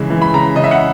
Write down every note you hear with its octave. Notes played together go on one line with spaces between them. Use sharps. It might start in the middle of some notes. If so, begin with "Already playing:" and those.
Already playing: C#3 E3 G#3
E3
B5
C#3 A#5
C#3 D#5
E5
F#5